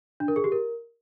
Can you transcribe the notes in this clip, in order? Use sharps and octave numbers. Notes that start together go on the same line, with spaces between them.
D4
A#4
G#4
G4
A#4